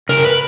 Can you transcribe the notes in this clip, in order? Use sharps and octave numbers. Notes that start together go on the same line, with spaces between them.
C#3 A#4
B4